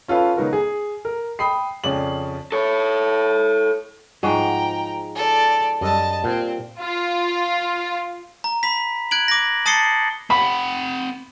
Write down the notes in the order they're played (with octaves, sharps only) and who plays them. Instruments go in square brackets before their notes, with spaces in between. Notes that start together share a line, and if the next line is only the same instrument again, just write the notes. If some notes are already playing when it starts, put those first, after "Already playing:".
[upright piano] C#4 F4 A4 B4 F5
C#3 F#3 B3 D#4 F#4 A#4
G#4
A#4
G5 B5 D#6 C7
F2 C#3 C#4 D5 F#7
[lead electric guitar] A4 C#5
[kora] G#2 F3 G#3 [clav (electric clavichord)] F#4 [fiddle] G5 A#5
[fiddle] A4 D5
[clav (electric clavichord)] F#2 [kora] G3 [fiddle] D#5 A5
[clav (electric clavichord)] A#2 [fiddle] C4
[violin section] F4
[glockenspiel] A#5
B5 B6
F#6 G#6 D7 F#7
D6 A#6
A5 D#6 A6 C7 C#7 G7
[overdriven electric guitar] C4 F#5 [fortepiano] B5